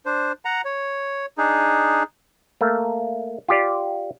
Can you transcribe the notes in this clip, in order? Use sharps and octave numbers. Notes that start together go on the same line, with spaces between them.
D4 C5
F#5 A#5
C#5
D4 D#4 G#4
A3 A#3
F4 G4 D5